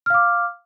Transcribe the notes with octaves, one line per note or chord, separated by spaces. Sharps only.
F5 D6 F6